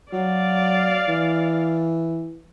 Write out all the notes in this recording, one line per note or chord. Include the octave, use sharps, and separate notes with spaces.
F#3 D5 F5
E3